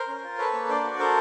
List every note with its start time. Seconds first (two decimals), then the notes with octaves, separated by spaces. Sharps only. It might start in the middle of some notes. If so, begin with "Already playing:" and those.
Already playing: A#4 C5
0.08 C#4
0.23 F4
0.38 A4 B4 C#5
0.54 A#3
0.69 D4 C5 D5
0.84 F#4
0.99 A4 A#4 C5